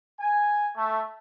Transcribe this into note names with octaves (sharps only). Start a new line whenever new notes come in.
G#5
A3